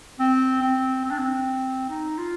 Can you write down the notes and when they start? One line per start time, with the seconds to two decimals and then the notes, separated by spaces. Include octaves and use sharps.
0.19 C4
0.61 C4
1.04 C4
1.11 D4
1.18 C4
1.89 D#4
2.18 F4